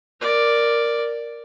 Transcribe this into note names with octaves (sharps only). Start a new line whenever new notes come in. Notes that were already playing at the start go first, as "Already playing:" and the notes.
A#4 D5